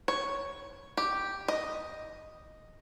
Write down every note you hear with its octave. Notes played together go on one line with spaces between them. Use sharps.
C#5
G4
D#5